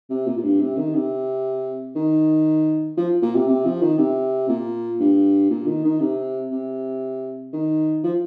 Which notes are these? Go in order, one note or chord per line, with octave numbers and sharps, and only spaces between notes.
C3
A#2
A#2
G2
C3
D#3
C3
D#3
F3
A#2
C3
C3
F3
D#3
C3
A#2
G2
A#2
D#3
D#3
C3
C3
D#3
F3